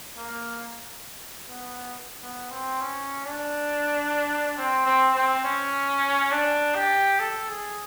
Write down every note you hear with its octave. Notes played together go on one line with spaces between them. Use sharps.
A#3
B3
B3
C4
C#4
D4
C4
C4
C4
C#4
D4
G4
A4
G#4